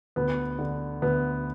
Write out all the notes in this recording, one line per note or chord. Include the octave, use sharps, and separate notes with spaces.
D2 B3
D3
D2 B3